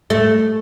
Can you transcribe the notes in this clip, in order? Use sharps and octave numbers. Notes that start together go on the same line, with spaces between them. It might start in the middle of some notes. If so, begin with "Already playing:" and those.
A3